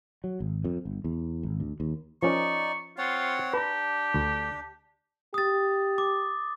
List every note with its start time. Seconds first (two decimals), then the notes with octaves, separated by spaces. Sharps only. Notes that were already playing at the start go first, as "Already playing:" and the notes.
0.24 F#3
0.40 G#1
0.64 F2
0.85 G1
1.04 E2
1.43 G#1
1.60 D2
1.80 D#2
2.23 F3 C#4 D#4 A#4 D5 C#6
2.98 C4 F4 C#5 F#5
3.54 D4 G4 B4 A#5
4.14 D2
5.34 G4 D#6 A6
5.98 D6